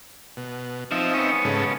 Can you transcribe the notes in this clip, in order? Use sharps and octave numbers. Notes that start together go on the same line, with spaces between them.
B2
F3 C4 D#4 E5
B3 C#4
G#2 C#3 A4